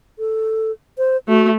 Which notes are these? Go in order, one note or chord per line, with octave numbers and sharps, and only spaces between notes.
A4
C5
A3 F#4